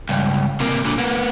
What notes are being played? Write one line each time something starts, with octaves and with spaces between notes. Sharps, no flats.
C#2 G2
C3 A#3
A#2 D3
A#3 B3